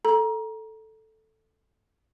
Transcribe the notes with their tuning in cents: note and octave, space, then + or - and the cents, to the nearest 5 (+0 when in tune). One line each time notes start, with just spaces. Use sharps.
A4 +0 A#5 +20